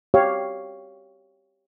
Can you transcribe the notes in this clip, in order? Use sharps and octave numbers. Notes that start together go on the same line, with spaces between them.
G4 C#5 F5